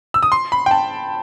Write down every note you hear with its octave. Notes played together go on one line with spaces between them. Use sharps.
E6
D#6
C6
B5
G5
A5